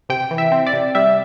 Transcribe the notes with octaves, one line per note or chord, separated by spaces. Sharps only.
C3 G5
E3
E5
C4
D5
C3
G3 E5